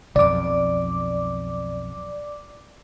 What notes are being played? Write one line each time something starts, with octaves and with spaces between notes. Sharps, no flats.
B1 F2 D5 D6